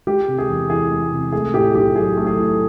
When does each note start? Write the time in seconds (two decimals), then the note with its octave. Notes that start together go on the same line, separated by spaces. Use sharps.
0.07 G#3 G4
0.28 C3
0.38 G#4
0.49 E2
0.70 E3 G#4
0.91 G#3
1.12 C3
1.32 A3 G#4
1.54 A2 G4
1.75 B1 G4
1.96 F#3 G#4
2.17 A3
2.27 G#4
2.38 A2